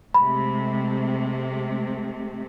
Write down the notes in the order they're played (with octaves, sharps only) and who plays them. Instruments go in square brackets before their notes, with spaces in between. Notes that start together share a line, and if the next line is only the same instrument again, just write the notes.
[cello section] C3 G#3 A3 [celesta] B5